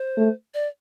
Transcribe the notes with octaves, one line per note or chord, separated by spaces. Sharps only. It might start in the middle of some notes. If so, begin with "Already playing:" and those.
Already playing: C5
A3
D5